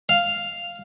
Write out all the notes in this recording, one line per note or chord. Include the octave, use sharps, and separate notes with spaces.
F5